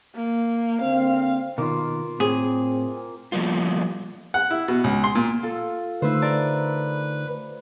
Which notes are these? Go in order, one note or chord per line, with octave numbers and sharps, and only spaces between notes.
A#3
D3 A#3 C4 F5
B2 D#3 A#3 F4
A2 C4 G#4
F3 G3 A#3 B3 F4
F#5
E4
B2
C#2
C6
A#2
F4 A4
D3 A3 D#4 B4 C5 E5
A#4 D5 A5